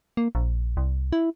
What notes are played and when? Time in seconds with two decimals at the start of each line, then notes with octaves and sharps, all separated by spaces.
0.17 A#3
0.35 A#1
0.77 C2
1.12 E4